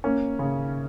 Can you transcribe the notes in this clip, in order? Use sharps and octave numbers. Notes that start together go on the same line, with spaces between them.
A#3 C#4
C#3